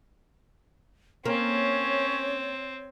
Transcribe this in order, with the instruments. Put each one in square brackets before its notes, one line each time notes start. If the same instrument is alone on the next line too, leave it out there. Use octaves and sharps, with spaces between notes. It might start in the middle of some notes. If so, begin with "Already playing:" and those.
[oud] A#3 [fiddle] C4 [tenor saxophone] C#4 [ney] C#5